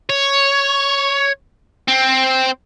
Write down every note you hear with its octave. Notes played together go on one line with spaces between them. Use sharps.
C#5
C4